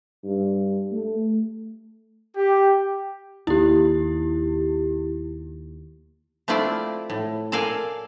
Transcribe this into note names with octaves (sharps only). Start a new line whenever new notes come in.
G2
A3
G4
D#2 E4 G4
A3 C4 D4 E4 F4 D5
A2
A4 A#4 D5 F5 G#5